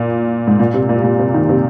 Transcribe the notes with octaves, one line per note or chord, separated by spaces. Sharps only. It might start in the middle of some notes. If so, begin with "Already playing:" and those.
Already playing: A#2
G#2
A#2
C3
A#2
A#2
C3
D#3
C3